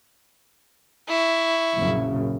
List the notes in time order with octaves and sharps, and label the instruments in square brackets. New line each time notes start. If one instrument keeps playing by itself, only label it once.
[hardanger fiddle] E4 C#6
[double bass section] A#1 F#2 C#3